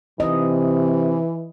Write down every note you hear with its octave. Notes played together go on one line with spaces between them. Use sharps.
C3 E3 D#5